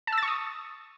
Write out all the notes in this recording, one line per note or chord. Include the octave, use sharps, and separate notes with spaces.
A5
E6
A6
C#6
D#6